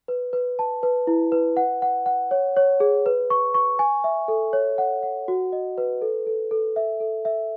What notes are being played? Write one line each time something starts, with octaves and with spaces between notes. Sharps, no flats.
B4
B4
A5
B4
E4
B4
F#5
F#5
F#5
C#5
C#5
G#4
B4
C#6
C#6
G#5
E5
A4
C#5
F#5
F#5
F#4
D#5
B4
A4
A4
A4
E5
A4
E5